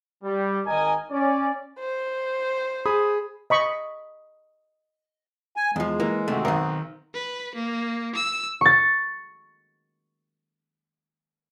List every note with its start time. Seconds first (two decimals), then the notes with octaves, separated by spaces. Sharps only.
0.24 G3
0.66 G#1 D#3 D#4 A#4 D#5 G#5
1.11 C#4 D5
1.80 C5
2.86 G#4 B5 D#6
3.50 D#5 B5 C#6
5.56 G#5
5.76 E2 F3 G#3
6.00 E3 A#3
6.28 C3 D#3 A3 F#4
6.45 B1 D#3 C4 A#4 F#5
7.14 B4
7.55 A#3
8.15 E6
8.61 C#6 A6